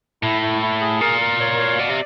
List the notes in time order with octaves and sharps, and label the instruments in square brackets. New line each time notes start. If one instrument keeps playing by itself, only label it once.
[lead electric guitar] A2 [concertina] E4
[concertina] E4
E4
G#4
[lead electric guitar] A#2 [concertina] A#4
[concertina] A#4
C#5
F5
[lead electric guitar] B2 [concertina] D5
[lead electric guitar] C3